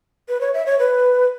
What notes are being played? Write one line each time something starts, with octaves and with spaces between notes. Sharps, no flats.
B4
C#5
E5
C#5
B4